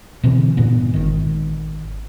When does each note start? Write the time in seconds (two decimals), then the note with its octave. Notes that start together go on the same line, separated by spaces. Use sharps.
0.24 B2 D3 E3 C4
0.57 G2 A#2 B3
0.94 G#1 D#3